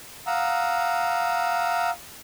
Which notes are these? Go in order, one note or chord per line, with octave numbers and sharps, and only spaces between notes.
F5 F#5 A#5 D#6 E6